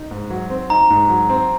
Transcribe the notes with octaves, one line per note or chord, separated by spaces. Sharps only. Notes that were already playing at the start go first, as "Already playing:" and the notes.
Already playing: D#4
G#2
F#3
C4
D#4 A#5
G#2
F#3
C4